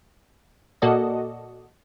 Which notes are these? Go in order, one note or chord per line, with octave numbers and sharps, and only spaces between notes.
A#2 A#3 F#4 A4 D5 D#5